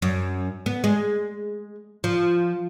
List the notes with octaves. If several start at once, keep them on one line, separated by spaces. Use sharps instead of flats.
F#2
B3
G#3
F3